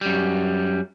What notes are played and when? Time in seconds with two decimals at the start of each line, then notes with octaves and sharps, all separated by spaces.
0.01 F#2 G3